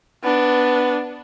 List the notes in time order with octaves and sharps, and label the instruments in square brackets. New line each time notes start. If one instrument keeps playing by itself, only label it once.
[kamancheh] B3 D4